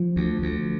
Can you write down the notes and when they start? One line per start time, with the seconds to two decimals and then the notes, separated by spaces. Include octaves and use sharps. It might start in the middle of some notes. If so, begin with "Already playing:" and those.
Already playing: F3
0.16 D2
0.42 D2